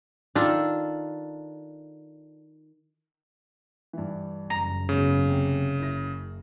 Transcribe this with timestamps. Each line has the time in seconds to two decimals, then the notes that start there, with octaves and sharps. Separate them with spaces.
0.35 D#3 D4 F4 A4
3.93 G2 E3
4.50 F#1 A#5
4.89 G#2 C#3 B3 F#4
5.29 C3
5.78 F#1 E4 A#6